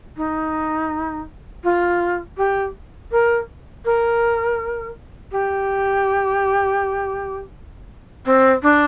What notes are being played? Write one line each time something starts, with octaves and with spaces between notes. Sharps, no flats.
D#4
F4
G4
A#4
A#4
G4
C4
D4